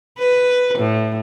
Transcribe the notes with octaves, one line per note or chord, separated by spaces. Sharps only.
B4
A2